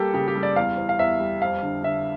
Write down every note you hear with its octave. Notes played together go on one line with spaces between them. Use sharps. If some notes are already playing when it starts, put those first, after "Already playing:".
Already playing: G3 A#3 G4 A4
C#3 G4
G4
G3
D5
E2 F5
E2
F5
E2 E5
G3
F2 F5
D3
D3 E5